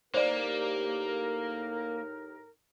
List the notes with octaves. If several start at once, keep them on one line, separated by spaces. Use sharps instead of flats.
A2 G3 A#3 D#4 G4 A#4 C5 D5